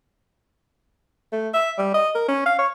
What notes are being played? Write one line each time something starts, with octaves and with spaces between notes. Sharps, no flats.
A3
E5
G3
D#5
A#4
C#4
F5
C#5